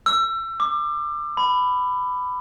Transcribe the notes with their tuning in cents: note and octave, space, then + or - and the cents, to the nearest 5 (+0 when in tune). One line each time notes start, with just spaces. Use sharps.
E6 +30
D6 +25
B5 +15